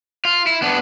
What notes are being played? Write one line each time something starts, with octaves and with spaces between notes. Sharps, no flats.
F4
E4
B3 D4